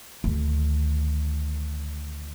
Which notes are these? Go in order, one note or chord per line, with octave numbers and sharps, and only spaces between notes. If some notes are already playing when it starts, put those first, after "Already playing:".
D2 D#3